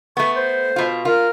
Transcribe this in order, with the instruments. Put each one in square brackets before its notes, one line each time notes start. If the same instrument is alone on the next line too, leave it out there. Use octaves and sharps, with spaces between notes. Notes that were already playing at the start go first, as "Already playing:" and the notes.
[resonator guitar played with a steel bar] A3 B3 [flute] C#6
[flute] C5
[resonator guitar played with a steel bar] B2 F4
[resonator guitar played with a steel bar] F4 [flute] A#4